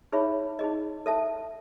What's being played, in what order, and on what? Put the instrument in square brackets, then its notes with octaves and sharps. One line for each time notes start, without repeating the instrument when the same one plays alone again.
[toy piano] D#4 G#4 C#5 E5 B5
D#4 G#4 D#5
A4 E5 A5